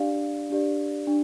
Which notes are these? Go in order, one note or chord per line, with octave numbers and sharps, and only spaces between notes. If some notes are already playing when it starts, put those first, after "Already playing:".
Already playing: D4 G4 D5 F5
D4 G4 D5
D4